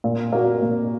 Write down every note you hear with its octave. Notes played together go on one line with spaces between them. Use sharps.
A#2
A#3 F#4 A#4
A#2